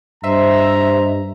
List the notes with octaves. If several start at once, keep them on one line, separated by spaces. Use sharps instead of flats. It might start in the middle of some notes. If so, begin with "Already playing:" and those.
G2 C5 D#5 E5 A#5 C6